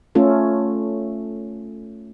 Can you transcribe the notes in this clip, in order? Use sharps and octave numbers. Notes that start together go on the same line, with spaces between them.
A3 C#4 F4 A4